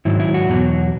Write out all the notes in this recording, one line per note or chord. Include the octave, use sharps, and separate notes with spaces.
G#2 D#3 F#3 E4
E4
F#4
E2 B2 F#3